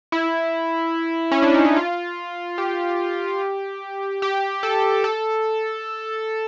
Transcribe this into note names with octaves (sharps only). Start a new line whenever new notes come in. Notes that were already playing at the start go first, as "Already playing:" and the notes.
E4
C#4
D4
D#4
E4
F4
G4
G4
A4
A4